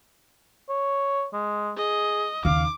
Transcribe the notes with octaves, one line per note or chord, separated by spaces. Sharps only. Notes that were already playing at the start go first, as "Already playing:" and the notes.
C#5
G#3
G#4 D#5
D#2 C#3 F5 D6